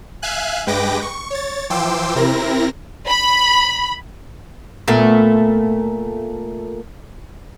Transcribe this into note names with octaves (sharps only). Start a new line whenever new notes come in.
E5 F5 G#5 F#6
G2 G#3 B4 G5 D6 A#6
C#6
C#5 A6
E3 F3 G5 C6 D6 E6
C3 C4 E4 A#4 A#6
B5
A#2 A3 B3